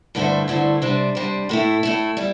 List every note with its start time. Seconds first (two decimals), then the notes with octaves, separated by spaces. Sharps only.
0.15 G2 D3 A3 E4 C5
0.48 G2 D3 A3 E4 C5
0.82 C3 G3 D4 C5
1.15 C3 G3 D4 C5
1.49 A2 A3 E4
1.83 A2 A3 E4
2.17 G3 E4